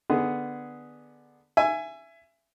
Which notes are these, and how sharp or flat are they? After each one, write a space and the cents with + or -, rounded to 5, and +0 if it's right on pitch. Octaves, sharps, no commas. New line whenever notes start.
D3 +15 B3 +0 G#4 +0
E5 +25 G#5 +0